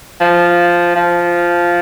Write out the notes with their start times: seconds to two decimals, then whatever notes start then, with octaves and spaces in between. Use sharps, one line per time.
0.21 F3
0.96 F3